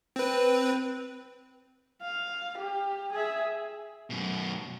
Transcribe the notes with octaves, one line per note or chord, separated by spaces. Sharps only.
C4 B4
F5
G4
G#4 E5
F#2 B2